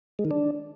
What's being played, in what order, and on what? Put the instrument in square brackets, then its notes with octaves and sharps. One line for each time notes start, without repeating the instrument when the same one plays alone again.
[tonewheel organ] G#3
D#3
D4